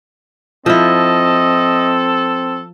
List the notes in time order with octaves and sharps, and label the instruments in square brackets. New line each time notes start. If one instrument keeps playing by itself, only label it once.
[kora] F3 E4 [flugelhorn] C4 [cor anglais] A4 [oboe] D#5